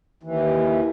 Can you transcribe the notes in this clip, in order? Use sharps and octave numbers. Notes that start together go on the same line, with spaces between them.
D#2 E3